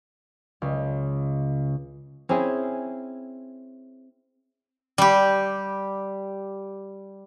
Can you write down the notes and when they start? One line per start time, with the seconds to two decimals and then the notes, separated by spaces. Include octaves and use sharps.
0.62 C#2
2.29 C4 C#4 E4 G#4
4.98 G3 G4